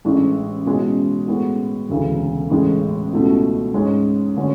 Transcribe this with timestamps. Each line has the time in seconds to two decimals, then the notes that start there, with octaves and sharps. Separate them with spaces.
0.05 A1 A2 E3 G#3 D4
0.66 B2 G#3 C#4 E4 G#4
1.27 A2 G#3 B3 F#4
1.89 E1 D2 C#3 E3
2.50 A1 A2 G#3
3.13 C#2 B2 A3 E4
3.74 G#2 G#3 C#4
4.36 D3 A3 C#4 F#4